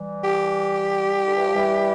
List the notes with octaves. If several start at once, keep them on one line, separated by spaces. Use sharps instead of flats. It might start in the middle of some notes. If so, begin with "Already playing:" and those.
Already playing: E3 G3
G4
D3
E3
F3
E3 G3